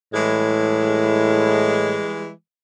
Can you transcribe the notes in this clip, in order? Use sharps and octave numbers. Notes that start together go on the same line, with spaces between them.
A2 E3 G3 G#3